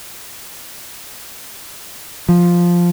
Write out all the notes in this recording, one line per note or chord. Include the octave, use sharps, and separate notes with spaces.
F3